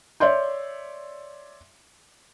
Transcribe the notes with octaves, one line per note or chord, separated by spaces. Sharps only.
C#5 D5 E5 C6 G6